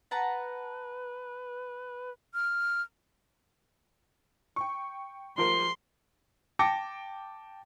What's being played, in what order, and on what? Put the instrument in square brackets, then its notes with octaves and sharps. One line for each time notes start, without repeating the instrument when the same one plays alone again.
[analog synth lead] B4 [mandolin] F#5 A5 A#5
[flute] F6
[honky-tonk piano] G5 C#6
[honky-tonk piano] F3 A#4 [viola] C6
[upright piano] G5 A5 D6 A#6 C#7